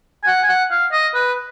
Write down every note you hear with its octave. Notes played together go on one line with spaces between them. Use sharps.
G#5
F#5
G#5
F#5
F5
D#5
B4